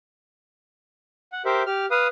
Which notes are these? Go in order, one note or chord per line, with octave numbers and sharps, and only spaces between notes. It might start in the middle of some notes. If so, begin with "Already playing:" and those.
F#5
G4 A#4 C5 E5
G4 F6
B4 F5 D#6